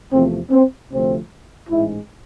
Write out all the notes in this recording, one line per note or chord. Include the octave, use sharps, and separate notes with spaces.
E2 C3 F3 A3 C4
C4
D2 C3 F3 A3 C4
A1 G#2 G#3 E4